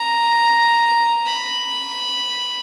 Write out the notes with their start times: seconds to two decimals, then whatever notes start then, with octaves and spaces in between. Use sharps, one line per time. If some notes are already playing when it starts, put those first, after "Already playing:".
Already playing: A#5
1.26 B5